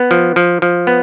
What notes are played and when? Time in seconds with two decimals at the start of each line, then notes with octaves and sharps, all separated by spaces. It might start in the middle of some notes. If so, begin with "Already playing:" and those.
Already playing: B3
0.11 F3
0.36 F3
0.62 F3
0.87 B3